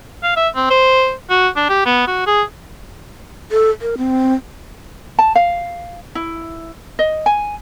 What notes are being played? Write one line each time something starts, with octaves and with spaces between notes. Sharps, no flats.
F5
E5
C4
C5
F#4
D4
G4
B3
F#4
G#4
A4
A#4
C4
A5
F5
E4
D#5
G#5